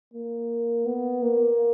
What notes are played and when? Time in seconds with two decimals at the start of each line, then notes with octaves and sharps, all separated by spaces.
0.14 A#3
0.85 B3
1.22 A#3